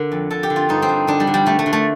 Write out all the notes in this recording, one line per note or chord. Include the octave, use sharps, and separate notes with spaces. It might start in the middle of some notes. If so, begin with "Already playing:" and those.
Already playing: D3 A#4
F2
D3 A4
G4
D3
F4
G2 D#4
C4
G2
D3 D4
G3
D3
G3
D3 A3
A3
D3
A3